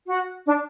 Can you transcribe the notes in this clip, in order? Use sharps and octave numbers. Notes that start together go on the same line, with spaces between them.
F#4
D4